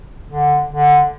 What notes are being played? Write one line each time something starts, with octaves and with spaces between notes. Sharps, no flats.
D3
D3